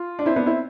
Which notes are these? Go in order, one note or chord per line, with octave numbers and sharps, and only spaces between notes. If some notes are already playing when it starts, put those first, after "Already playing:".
Already playing: F4
D4
C4 E4
B3 D4
C4 E4